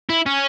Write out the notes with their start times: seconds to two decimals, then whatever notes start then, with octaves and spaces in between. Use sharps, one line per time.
0.09 E4
0.26 C#4